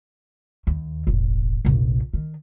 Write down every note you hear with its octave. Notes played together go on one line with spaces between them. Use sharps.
D#2
E1 A1
F1 A#1
D#3